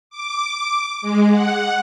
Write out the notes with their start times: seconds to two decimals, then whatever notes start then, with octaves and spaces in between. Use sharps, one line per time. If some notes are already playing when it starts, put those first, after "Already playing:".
0.10 D6
1.02 G#3
1.31 F#5